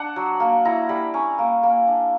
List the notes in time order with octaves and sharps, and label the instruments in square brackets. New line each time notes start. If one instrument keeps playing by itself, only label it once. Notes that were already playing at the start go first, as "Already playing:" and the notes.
Already playing: [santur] D4 F#5
F#3
A#3
E4 A#5
G3 B5
C#4 A#5
A#3
A#3
D4